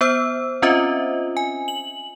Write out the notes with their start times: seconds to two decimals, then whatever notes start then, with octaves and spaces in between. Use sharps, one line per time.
0.01 B3 C5 E6
0.62 C4 C#4 F4 C5 D#5 E5
1.37 G#5
1.68 F#7